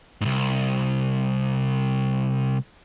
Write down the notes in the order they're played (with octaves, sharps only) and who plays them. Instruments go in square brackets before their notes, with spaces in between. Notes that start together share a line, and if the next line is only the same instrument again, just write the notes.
[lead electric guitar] C2 G#2